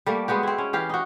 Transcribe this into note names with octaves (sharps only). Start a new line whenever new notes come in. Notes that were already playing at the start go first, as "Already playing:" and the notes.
G3 A3 A#3
G#3 B3 F#4 G4
C4 E4
C#4
E3 G4 F5
D#4 F#4